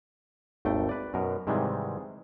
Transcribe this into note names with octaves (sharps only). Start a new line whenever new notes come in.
G#1 D#2 A3 G5
B4 D5
F#2 B2 A#4
G#2 C3 D#3 E3 G3 G#3